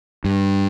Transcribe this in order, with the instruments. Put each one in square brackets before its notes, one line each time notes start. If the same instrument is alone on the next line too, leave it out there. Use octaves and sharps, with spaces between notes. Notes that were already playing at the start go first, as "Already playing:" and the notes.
[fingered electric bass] G2